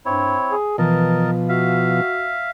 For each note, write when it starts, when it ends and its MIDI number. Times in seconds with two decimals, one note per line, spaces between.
0.05 0.36 43
0.05 0.55 60
0.05 0.55 64
0.05 0.55 73
0.51 0.75 68
0.78 2.01 47
0.78 1.33 52
0.78 2.01 53
0.78 1.31 70
0.78 1.31 75
0.78 1.31 81
1.49 2.34 66
1.49 2.51 76
1.49 2.51 77